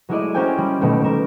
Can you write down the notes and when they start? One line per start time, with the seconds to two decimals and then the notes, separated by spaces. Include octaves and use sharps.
0.09 F#3 G#3 A3 E4 D5 D#5
0.34 C#4 F#4 A#4 C5 G5 G#5
0.58 G3
0.81 B2 D#3 F#3 G3 A3
1.04 B2 A#4 E7